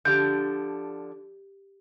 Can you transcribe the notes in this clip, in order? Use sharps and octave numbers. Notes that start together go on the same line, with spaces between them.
D3 F3 D4 G4 G6